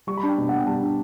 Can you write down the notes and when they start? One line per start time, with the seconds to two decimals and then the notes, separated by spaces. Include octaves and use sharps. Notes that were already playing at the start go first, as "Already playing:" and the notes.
0.07 G3 C#6
0.17 B5
0.23 D4
0.28 G5
0.38 B2
0.49 B2 F#5
0.58 G5
0.67 G3 A5
0.82 D4